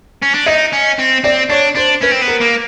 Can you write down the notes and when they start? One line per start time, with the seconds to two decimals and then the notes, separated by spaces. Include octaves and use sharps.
0.22 C#4
0.34 D4
0.46 D#4 D#5
0.73 C#4
0.98 C4
1.24 C4 D5
1.50 D4 C#5
1.76 D4 C5
2.02 C#4 B4
2.12 C4
2.22 B3
2.28 A#4
2.41 A#3